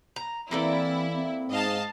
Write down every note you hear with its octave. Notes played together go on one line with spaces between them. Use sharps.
A#5
E3 A#3 C4 E4 A4 D5
C4
G#2 D#5 F5 A5